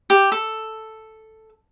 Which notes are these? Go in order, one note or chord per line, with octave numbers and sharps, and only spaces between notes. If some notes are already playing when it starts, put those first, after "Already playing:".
G4
A4